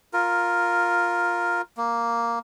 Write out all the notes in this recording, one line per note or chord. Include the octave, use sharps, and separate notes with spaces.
F4 A#4
A#3